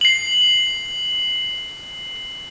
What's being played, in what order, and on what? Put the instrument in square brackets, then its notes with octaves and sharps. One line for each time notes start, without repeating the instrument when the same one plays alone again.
[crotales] C7 F#7